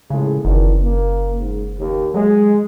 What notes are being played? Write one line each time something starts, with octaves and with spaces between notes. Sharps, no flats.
A#1 A2 C#3 G#3
F#1 D#3 E3 D4
A#3
G#2
D#2
F#3 G#3